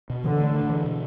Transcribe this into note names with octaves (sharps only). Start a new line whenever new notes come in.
B2
D3 E3
A3
D4
E3
B2